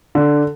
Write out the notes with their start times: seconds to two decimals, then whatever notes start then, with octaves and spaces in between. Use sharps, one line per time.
0.15 D3